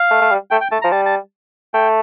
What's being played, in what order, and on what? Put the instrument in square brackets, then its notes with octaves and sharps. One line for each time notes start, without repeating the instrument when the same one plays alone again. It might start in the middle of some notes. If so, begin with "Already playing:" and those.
Already playing: [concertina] F5
[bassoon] A3
A3
G3
[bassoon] A3 [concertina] G5
[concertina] G5
[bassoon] A3 [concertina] A5
[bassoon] F3 [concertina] A#5
[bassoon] G3 [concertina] A5
[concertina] A5
[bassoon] A3 [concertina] G5